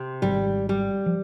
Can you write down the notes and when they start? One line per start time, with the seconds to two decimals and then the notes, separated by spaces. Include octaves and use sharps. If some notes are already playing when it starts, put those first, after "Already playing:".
Already playing: C3
0.22 G#1 G#2 G3
0.69 G3
1.06 F3